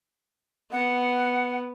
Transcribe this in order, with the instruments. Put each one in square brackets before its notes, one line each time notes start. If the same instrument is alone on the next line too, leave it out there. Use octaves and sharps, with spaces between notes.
[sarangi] B3 [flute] F#5